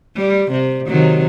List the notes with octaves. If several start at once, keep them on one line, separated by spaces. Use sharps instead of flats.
G3
C3
C3 D#3 F#3